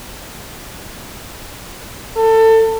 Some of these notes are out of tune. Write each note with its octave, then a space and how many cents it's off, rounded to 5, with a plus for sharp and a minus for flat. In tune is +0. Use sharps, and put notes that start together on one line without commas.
A4 +25